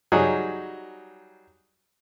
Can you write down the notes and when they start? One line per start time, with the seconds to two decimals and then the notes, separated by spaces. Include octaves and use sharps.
0.12 F#3 G3 D#4 G#4